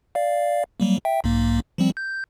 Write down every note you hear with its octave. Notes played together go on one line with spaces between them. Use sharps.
D5 F5
F#3 G3 A#3
E5 G5
B1 G#2 A#3
F3 G3 C4
G6